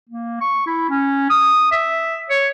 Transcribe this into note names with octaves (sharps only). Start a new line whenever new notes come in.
A#3
C#6
E4
C#4
D#6
E5
C#5